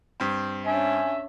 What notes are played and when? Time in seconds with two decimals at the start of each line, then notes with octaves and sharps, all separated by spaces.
0.20 G2 C4
0.66 C#4 D4 E5 G#5